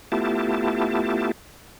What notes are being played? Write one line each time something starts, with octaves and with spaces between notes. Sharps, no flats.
A3 B3 E4 F4 G4 A5